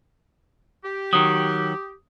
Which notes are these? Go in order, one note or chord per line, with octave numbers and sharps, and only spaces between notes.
G4
D#3 F#3 D#6